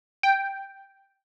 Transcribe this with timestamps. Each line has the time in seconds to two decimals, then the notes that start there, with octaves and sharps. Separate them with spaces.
0.23 G5